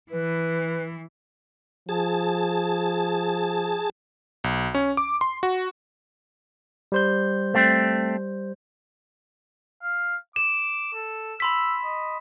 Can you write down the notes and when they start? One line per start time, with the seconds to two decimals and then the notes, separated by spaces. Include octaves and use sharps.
0.11 E3 B4
1.89 F3 G#4 A5
4.44 B1
4.75 C#4
4.97 D6
5.21 C6
5.43 F#4
6.92 G3 C5 G6
7.54 A3 C4
9.83 F5
10.36 D6 E7
10.94 A4
11.40 B5 C6 E6 B6
11.85 D#5